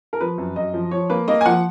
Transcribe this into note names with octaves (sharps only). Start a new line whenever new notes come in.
A#4
F3 B4
F#2
F#2 D#5
F3
F3 C#5
A#3 B4
A#3 D#5
G#5
F3 F#5